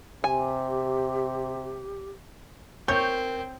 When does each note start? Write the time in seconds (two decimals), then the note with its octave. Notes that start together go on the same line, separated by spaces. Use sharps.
0.24 C3 G4 G#5
2.88 C4 A#4 C#5 G6